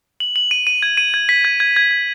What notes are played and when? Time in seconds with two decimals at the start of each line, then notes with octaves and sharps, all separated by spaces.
0.20 F#7
0.36 F#7
0.51 D#7
0.67 D#7
0.83 G#6
0.97 D#7
1.14 G#6
1.29 B6
1.45 G#6
1.60 G#6
1.76 G#6
1.91 G#6